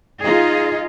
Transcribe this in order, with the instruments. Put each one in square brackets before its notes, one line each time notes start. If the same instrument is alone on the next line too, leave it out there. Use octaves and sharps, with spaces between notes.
[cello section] D#4 F4 G#4 D#5